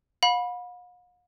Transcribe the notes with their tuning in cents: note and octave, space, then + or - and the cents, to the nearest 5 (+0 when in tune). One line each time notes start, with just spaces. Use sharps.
F5 +45 B5 -15